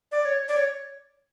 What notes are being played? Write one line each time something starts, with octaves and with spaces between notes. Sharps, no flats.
D5
C#5
D5
C#5